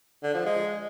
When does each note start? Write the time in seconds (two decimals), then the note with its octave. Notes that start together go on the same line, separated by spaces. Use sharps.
0.23 D3
0.34 F3
0.46 G#3